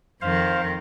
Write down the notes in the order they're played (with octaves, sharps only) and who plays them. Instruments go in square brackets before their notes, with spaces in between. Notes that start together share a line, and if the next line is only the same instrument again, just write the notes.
[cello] F2 D#3 [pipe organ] C5 F5